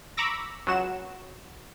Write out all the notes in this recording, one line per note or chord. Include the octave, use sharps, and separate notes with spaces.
A#5 B5 C#6 D6 E6 A#6
C#2 F#3 F#4 E7